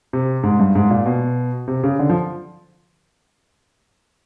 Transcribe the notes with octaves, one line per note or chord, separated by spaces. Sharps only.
C3
G#2
G2
G#2
A#2
B2
C3
C#3
D3
F3